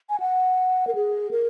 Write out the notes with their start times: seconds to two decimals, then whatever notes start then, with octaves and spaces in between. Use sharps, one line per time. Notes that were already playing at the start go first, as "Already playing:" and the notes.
0.09 G#5
0.20 F#5
0.87 A#4
0.95 G#4
1.31 A#4